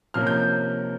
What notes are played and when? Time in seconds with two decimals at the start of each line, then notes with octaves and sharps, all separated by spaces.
0.14 C3 F3 A#3 C#4 F6
0.27 G6